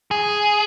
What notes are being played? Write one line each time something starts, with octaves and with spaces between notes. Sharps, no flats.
G#4